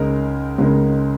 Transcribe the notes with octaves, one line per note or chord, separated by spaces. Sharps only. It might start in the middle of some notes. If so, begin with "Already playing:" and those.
Already playing: C#2 C#3 G#3 D#4 A#4
C#2 C#3 G#3 D#4 A#4